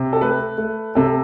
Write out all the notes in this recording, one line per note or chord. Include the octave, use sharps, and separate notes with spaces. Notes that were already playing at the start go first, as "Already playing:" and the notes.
Already playing: C3
A4
A3 B4
A3
C3 A4